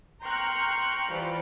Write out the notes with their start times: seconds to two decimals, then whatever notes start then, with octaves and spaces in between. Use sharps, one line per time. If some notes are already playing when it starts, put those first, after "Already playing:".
0.23 G5 A#5 C6 C#6 F6 F#6
1.10 E3 F3 G3 F4